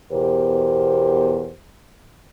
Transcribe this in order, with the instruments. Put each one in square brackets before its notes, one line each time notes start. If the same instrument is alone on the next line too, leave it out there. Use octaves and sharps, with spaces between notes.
[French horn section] E2 B2 G4 A#4 C5